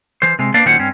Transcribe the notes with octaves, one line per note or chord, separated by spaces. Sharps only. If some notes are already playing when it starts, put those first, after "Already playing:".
E3 C5
C3 G#3
A#3 D4 B4 D5 F5
A#2 D#3 F#3 C#4 C5 F#5
G2 C4 C#4